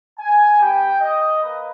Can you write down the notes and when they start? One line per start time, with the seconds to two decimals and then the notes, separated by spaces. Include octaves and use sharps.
0.19 G#5
0.60 B3 G4 G5
1.02 D#5
1.43 A#3 B4